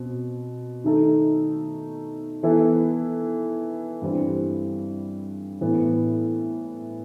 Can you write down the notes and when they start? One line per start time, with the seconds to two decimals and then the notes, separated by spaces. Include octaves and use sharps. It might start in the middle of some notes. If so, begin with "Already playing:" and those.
Already playing: B2 C4
0.84 D#3 A3 D#4 A4
2.43 E3 B3 E4 A4
4.01 G2 E3 G3 C4
5.61 A2 E3 B3